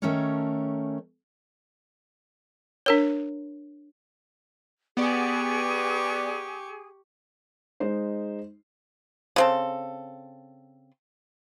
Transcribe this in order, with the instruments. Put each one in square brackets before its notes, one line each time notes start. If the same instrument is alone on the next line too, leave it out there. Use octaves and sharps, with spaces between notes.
[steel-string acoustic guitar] D#3 A3 C#4 A4 A#4 C#5
[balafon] D4 A#4 C#5
[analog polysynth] B3 D5 [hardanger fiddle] G4 C#6 [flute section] G#4
[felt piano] G#3 D#4 C5
[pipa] C#3 C4 A4